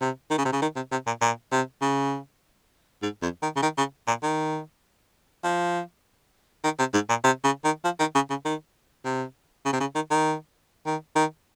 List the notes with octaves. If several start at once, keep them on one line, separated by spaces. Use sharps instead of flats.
C3
D#3
C#3
C3
C#3
D#3
C3
C3
A#2
A#2
C3
C#3
G#2
F2
D#3
C#3
D#3
C#3
A#2
D#3
F3
D#3
C3
G#2
A#2
C3
C#3
D#3
F3
D#3
C#3
C#3
D#3
C3
C#3
C3
C#3
D#3
D#3
D#3
D#3